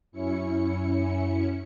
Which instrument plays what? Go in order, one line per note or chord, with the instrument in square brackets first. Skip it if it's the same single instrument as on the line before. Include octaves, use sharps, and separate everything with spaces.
[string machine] F#2 C#4 E4 C#7